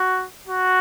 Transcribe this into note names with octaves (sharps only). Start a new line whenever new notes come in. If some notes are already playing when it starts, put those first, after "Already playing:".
Already playing: F#4
F#4